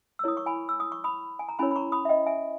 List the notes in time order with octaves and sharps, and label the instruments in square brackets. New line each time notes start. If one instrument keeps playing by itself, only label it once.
[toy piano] E6
E4 A#4 C#5 D#6
C#6
G#5 B5
E6
D#6
C#6
B5 D#6
G#5
A#5
C#4 E4 A#4 C#5 G#5 B5
B5
A#5 C#6
B5 D#6
E5
D#5 G5
E5 G#5